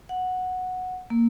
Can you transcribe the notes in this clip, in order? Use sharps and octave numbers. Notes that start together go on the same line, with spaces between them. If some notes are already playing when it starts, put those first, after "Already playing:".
F#5
A#3